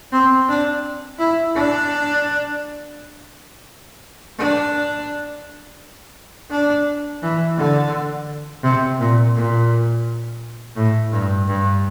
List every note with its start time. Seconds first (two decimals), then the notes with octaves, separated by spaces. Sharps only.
0.13 C4
0.49 D4
1.19 E4
1.55 D4
4.39 D4
6.51 D4
7.22 E3
7.58 D3
8.63 C3
8.99 A#2
9.35 A#2
10.77 A2
11.12 G2
11.47 G2